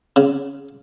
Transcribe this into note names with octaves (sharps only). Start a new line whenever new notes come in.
C#3